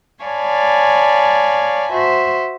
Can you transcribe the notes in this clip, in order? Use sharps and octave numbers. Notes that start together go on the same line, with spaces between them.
C#5 D5 F5 G#5 A5 B5
F#4 C5 E5